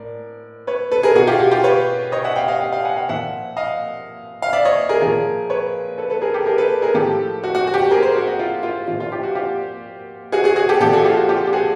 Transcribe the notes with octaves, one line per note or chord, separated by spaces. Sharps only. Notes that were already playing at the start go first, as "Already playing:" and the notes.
Already playing: A2 A#4 D5
B4 C#5
A4 B4
G#4 A#4
B2 F#4 G#4
F4 G4
F#4
F4 G4
B4 C#5
C#5 D#5
E5 F#5
F5 G5
D#5 F5
F5 G5
F5 G5
F#5 G#5
F5 G5
A#2 F3 E5 F#5
D#5 F5
F5
D5 E5
C#5 D#5
G#4 A#4
A#2 F3 G#4 A#4
B4 C#5
A4 B4
A4 B4
G#4 A#4
G4 A4
G#4 A#4
A4 B4
G#4 A#4
A2 F3 G4 A4
F#4
F#4
F#4
G4
F#4
G#4 A#4
A#4 C5
F#4
F#4
F4
F4
A#2 F3 F4
F4
F4 G4
F#4
F4 G4
F#4 G#4
F#4 G#4
F#4 G#4
G4 A4
A#2 F3 G4 A4
F#4 G#4
F4 G4
F#4
F4 G4
G4
F#4 G#4